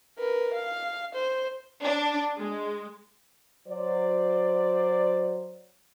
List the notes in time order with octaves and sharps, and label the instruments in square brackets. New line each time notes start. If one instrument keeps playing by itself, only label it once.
[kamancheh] A#4 B4
F5
C5
[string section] D4
G#3
[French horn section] F#3 C5 D5